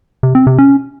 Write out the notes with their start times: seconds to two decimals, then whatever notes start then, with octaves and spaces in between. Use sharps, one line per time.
0.23 C3
0.35 C4
0.47 C3
0.58 C#4